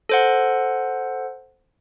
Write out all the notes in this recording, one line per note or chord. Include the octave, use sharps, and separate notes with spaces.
A4 C5 F#5